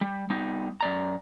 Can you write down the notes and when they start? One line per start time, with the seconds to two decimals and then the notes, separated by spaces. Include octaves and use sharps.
0.01 G3
0.30 G3 B3 D#4
0.81 F#2 D5 A#5